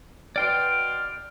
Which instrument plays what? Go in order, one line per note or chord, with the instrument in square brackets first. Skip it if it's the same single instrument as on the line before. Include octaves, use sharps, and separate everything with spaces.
[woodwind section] B2 F6 [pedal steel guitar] D5 G5 C6